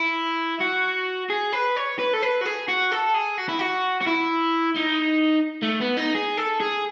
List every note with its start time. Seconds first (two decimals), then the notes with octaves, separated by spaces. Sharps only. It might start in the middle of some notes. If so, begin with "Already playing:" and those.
Already playing: E4
0.61 F#4
1.30 G#4
1.53 B4
1.76 C#5
1.99 B4
2.13 A4
2.22 B4
2.41 F#4
2.45 G#4
2.68 F#4
2.91 A4
3.14 G#4
3.38 F#4
3.49 E4
3.59 F#4
4.01 F#4
4.07 E4
4.76 D#4
5.62 A3
5.80 B3
5.97 D#4
6.15 G#4
6.37 A4
6.60 G#4